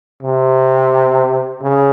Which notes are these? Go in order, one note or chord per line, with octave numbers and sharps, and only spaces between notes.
C3
C#3